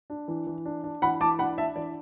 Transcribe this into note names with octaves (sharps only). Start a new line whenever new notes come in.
D4
E3
E3
D4
D4
E3 F#5 B5
E3 A5 D6
D4 F#5 B5
D4 E5 A5
E3 D5